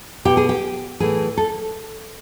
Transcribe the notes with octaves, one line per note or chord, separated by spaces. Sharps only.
B2 G4
G#4
G4
A2 E3 G#4
A4